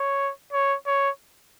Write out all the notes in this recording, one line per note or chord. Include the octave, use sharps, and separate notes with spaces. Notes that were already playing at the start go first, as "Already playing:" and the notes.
Already playing: C#5
C#5
C#5